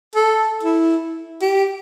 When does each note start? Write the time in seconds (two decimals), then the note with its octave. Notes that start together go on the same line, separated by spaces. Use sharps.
0.15 A4
0.63 E4
1.42 G4